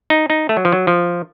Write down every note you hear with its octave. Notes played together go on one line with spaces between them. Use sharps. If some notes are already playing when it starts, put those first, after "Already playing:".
D#4
D#4
A3
F#3
F3
F#3
F3